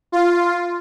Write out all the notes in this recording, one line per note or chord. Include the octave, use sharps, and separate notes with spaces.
F4